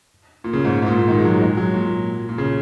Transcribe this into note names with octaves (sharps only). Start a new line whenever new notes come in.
A#2
C#3
G#2
G#2
A#2
A#2
D#3
G#3
F#3
G#3
F#3
A#2
A#2
C#3